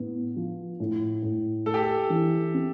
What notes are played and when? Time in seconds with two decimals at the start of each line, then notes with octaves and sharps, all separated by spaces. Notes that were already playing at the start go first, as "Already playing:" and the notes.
Already playing: A2 B3
0.36 F3
0.80 A2
1.23 A2
1.66 A3 A4
1.74 G4
1.83 A4
2.10 E3
2.54 C4